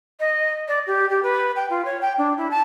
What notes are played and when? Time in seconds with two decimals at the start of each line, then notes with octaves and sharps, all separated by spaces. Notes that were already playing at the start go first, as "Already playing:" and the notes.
0.20 D#5
0.68 D5
0.87 G4
1.10 G4
1.23 B4
1.56 G5
1.70 F4
1.85 C#5
2.01 G5
2.18 D4
2.37 E4
2.51 A5